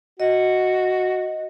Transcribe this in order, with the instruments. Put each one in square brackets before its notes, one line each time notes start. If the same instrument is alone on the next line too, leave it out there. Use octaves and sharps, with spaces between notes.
[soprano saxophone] F#4 [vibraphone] D#5